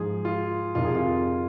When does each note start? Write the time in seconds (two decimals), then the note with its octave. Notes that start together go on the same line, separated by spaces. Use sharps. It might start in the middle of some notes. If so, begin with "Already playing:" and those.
Already playing: G#2 F3 G#4
0.25 F4
0.75 F2 C3 D#3 F4
0.85 G#4
0.95 F4